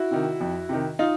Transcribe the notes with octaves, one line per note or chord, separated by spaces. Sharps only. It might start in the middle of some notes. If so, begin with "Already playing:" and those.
Already playing: E4 F#4
C3 D#3
F2
C3 D#3
D#4 F4